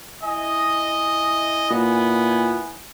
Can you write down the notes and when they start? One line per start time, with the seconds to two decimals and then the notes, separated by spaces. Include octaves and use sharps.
0.23 E4 D#5 G#5
1.70 A#2 B3